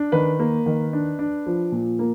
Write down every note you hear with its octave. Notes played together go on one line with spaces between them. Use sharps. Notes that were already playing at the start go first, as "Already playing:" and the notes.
Already playing: D4
D#3 B4
A#3
D#3
D4
D4
F3
A#2
A#3